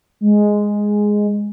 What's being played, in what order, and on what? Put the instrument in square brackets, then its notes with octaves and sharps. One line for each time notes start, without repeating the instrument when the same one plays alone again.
[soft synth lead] G#3